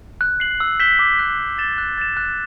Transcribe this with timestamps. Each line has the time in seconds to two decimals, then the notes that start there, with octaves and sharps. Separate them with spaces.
0.21 F#6
0.40 C7 F#7
0.60 E6
0.80 G6 B6 E7 G7
0.99 D6
1.19 F#6 B6
1.39 F#6
1.58 A6 E7 G7
1.78 F#6
1.98 A6 E7
2.17 F#6